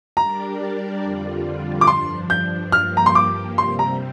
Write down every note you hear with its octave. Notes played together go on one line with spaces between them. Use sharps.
G3 D4 G4 A#4 D5 A#5
F2 D3 G3 D4 F4
D6
G2 F3 D4 C6
G6
G2 F3 A#3 G4 F6
A#5
C6
D6
C3 G3 C4 C6
A#5